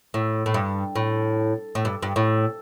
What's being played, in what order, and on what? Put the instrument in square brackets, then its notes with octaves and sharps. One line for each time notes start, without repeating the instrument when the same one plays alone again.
[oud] A2
A2
G2
A2
A2
G2
G2
A2